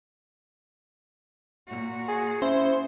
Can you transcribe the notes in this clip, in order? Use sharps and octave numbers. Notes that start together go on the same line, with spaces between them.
A#2 F#4
G#4
C#4 E4 C5